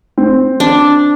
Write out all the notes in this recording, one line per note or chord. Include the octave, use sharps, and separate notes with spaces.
C4
D4